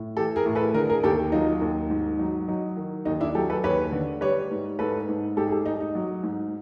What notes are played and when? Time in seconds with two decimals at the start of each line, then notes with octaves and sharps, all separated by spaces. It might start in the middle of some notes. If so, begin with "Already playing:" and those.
Already playing: A2
0.17 E3 G4 A4
0.36 G#4 A#4
0.46 A2
0.55 A4 B4
0.74 D3 G#4 A#4
0.90 G#4 A#4
1.03 D#2 G4 A4
1.32 F#3 D#4 F4
1.62 D#2
1.90 G#2
2.19 F#3 D#4
2.48 F#3 D#4
2.77 D#3
3.05 D#2 D#4
3.20 D4 E4
3.34 F#3 G4 A4
3.50 A4 B4
3.64 D#2 B4 C#5
3.92 D3
4.21 G3 B4 C#5
4.51 G#2
4.79 G#2 A4 B4
5.09 G#2
5.37 G#2 G4 A4
5.47 G#4
5.51 G4 A4
5.66 G#2 D#4
5.80 D#4
5.95 F#3
6.23 G#2